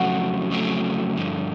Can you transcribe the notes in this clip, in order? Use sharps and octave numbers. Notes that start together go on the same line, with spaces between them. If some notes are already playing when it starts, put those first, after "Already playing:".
Already playing: F2 C#3 F#3 A3 C4 F#4
F2 C#3 F#3 A3 C4
G2 D3 F3